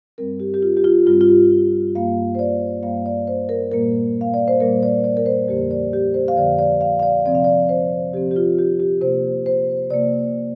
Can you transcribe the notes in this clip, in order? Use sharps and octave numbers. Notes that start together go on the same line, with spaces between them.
G2 G3 C4 A#4
G4
G4
F4
G4
F4
G2 G3 C4 F4
F4
G4
G2 G3 A#3 F5
C5
D5
G2 G3 A#3 F5
D5
C5
A#4
A#2 G3 A#3 A#4
F5
D5
C5
A#2 G3 A#3 A#4
D5
D5
A#4
C5
F2 D3 F3 A#3 G4
D5
G4
C5
F5
F2 D3 F3 A#3 D5
D5
F5
F5
D5
C3 F3 C4 D5
F5
D5
C5
C3 F3 C4 G4
G4
F4
G4
G4
C3 A#3 C5
C5
C3 A#3 D5